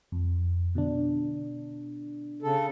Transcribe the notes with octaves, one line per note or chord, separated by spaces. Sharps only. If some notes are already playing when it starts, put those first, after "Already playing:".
F2
B2 D3 D4
C#3 A4